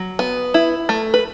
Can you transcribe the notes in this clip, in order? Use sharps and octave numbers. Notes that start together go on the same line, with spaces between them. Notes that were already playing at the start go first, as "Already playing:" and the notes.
Already playing: F#3
B3
E4
A3
B4